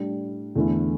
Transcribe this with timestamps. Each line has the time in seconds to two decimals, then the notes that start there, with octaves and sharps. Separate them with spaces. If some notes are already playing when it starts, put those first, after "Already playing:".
Already playing: A2 G3 D4
0.56 E2 D3 A3 E4